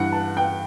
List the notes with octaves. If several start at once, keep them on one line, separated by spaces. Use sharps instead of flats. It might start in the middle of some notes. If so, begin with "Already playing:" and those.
Already playing: G2 E3 F#5
A5
G5